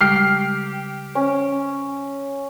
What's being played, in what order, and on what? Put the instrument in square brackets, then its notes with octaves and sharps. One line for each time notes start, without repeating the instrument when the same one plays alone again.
[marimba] C#3 G3 G#3 [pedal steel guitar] G4 [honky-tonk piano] F6 C7
[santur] C#4 [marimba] C5